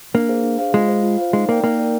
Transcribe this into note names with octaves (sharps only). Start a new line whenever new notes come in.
A#3 D4
G#4 C5 F5
D4
G#4 C5 F5
G#3 F4
C5 F5
F4
C5 F5
G#3 D#4
A#3 A#4 D5 G5
A#3 D#4
A#4 D5 G5